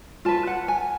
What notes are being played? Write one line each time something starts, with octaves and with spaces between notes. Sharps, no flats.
F4 B4 A5
F#5
G#5